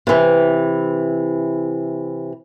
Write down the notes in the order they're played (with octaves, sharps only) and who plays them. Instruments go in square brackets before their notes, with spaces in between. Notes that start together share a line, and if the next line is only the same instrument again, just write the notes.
[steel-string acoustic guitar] C3 E3